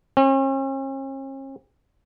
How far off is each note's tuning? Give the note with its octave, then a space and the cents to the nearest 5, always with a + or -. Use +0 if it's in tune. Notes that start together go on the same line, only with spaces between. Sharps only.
C#4 -45